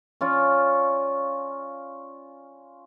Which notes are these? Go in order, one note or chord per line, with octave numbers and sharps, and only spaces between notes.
C#4 F4 C#5 D5